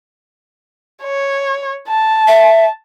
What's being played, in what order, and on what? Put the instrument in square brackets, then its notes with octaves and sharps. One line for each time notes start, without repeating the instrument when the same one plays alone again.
[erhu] C#5
A5
[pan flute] E5